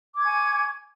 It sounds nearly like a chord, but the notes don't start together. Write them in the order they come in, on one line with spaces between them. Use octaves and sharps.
D6 G#6 C#6 G#5